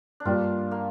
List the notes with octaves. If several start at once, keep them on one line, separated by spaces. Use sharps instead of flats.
D4
G2 G3 A#3 F4 G4 D5
A#3